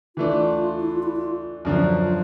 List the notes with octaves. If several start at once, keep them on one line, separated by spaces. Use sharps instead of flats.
E3 A3 D4 F4
E4
F4
E4
F4
F#2 D3 F3
F4